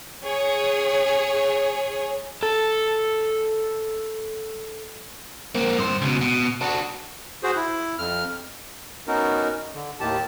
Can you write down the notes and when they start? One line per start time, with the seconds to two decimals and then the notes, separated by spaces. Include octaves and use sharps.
0.23 G#4 C#5
2.43 A4 A5
5.55 A#3 C4
5.78 G2 C5
6.02 C#2 B2
6.21 B2
6.62 D4 F#4
7.43 F#4 G#4 C5
7.56 E4
7.98 F2 F6
9.08 B3 C#4 D#4 F#4 A#4
9.74 D3
10.00 D#2 A2 D#3 G4 A5